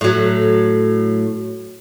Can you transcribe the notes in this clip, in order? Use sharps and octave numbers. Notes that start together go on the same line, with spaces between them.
A2 F#3